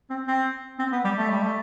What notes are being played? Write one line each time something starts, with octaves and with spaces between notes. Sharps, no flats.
C4
C4
C4
B3
G3
A3
G3
A3